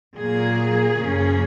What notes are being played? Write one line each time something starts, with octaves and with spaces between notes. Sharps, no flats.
A#2 F#3 A#3 G#4
F#2 C#3 F3 A#3 C#4